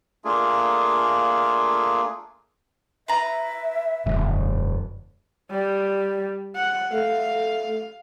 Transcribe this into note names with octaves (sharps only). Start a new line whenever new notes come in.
A3 A#3 D4 F4 G#4
B4 E5 A#5
E1 F#2 D3 G#3
G3
F#5
A3 F5